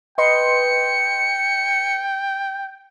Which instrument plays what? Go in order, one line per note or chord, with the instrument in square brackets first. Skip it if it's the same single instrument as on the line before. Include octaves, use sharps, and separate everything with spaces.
[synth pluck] B4 D#5 C6 [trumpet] G5 [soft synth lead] C#7